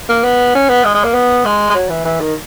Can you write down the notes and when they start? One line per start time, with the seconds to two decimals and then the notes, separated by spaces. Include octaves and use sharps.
0.09 A#3
0.24 B3
0.54 C#4
0.69 B3
0.84 G#3
0.94 G#3
1.04 A#3
1.14 B3
1.45 G#3
1.70 G#3
1.75 F#3
1.89 E3
2.05 E3
2.20 D#3